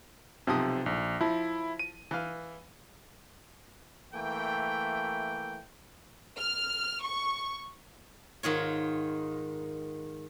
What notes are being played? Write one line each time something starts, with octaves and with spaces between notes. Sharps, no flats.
B1 C3 F3 D#6
A#1
F3 E4
D#7
E3 F5
E3 A3 A#3 G5
F6
C#6
G#2 D#3 F4 C#5